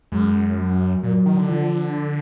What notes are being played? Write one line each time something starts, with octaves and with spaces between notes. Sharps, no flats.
F#2 G#3
F#3
A#2 F#3
D#3
D3
F3